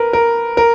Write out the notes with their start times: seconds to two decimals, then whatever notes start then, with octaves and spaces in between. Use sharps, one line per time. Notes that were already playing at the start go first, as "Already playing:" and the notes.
Already playing: A#4 B4
0.13 A#4
0.57 A#4